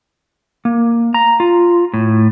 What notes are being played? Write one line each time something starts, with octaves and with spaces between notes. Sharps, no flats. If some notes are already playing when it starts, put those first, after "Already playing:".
A#3
A#5
F4
A2